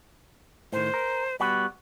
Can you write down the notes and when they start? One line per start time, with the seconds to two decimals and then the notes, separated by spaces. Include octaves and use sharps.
0.73 A2 D#3 C5
0.94 A#4
1.40 G3 B3 F#4 B5